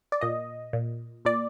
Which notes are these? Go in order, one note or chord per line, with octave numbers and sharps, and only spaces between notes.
D5
A#2 D#5
A#2
A#2 D5